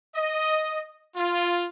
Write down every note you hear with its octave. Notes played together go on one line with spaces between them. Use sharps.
D#5
F4